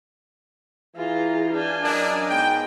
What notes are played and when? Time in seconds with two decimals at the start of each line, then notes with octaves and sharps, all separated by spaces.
0.96 E3 F4 G#4 A#5
1.53 D4 F5 G5 G#5
1.84 F#2 D4 A#4 D#5
2.30 G#2 B3 G5